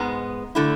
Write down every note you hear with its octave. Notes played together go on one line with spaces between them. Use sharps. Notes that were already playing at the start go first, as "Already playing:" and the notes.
Already playing: G#2 G#3 B3
D3 A3 E4